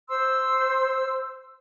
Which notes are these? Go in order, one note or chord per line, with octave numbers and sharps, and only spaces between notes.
C5 C6 E6